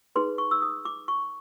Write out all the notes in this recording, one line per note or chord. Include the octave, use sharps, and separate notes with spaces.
D#4 G#4 B4 C6
C#6
E6
D#6
D6
C#6